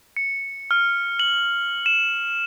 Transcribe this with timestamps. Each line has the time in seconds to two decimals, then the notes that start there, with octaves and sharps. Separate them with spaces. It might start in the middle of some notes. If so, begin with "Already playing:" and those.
0.16 C#7
0.71 F6
1.19 F#7
1.86 E7